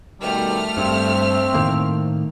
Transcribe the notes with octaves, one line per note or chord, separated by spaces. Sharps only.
B2 D#3 G3 A3 F6
G2 C4
A2 D#3 A#3